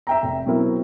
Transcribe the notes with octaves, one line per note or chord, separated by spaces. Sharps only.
E5 G5 A#5
F1
B2 F#3 C4 E4 A#4